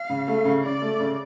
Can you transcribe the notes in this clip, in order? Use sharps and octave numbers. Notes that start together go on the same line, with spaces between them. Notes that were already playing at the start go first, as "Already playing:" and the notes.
Already playing: F5
C#3
A3
C#3
C#3 D5
A3
C#3